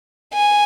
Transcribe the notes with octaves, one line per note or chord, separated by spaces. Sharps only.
G#5